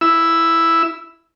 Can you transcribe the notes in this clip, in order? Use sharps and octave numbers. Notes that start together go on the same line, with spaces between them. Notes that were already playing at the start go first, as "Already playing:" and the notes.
E4 E6